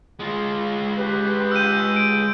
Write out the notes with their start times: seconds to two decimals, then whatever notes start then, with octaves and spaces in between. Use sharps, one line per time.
0.19 G#3 F4
0.95 G4 B4
1.51 E6 G6 D#7
1.96 D7